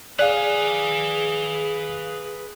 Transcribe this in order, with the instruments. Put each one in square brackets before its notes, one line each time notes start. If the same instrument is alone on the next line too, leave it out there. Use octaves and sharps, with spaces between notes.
[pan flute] G#4 [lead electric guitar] B4 G#5 [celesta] D5 [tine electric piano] F5 F#6